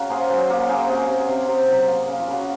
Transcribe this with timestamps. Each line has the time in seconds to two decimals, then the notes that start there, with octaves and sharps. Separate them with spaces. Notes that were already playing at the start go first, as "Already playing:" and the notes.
Already playing: C#3 F#4 A#4
0.10 A#3 G#4 C5
0.29 F#3 G#4 C5
0.50 A#3 A#4 C#5
0.69 C#3 G#4 C5
0.88 C3 F#4 A#4
1.08 C3
1.29 C3
1.48 C3
1.68 F#3
1.88 A#3
2.07 C#3
2.19 F4
2.27 C#3
2.32 F#4